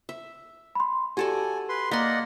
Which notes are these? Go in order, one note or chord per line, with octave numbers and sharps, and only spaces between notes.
E5
B5 C6
F#4 G4 A4 D5 G#5
B4 C6
A#3 D5 D#5 F#5 C6 B6